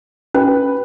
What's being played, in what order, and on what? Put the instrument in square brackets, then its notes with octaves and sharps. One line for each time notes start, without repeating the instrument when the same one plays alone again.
[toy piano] C#4 [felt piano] B4